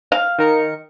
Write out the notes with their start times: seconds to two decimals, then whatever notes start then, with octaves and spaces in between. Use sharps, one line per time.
0.12 F5
0.39 D#3 A#4 C#7